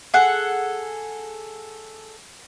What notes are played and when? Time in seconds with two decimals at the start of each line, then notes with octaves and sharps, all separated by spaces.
0.14 G#4 A4 F#5